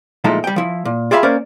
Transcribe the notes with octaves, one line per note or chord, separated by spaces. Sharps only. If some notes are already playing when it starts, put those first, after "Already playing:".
A#2 F3 G#3 A3 D#4 E4
G3 G5
F3 E4
A#2
F4 G4 G#4 E5 F5 B5
A#3 C#4 A#4 C5 D5